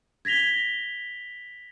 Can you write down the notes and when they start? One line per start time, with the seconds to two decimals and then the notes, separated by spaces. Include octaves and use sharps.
0.25 G#6 A#6 B6 F7 G7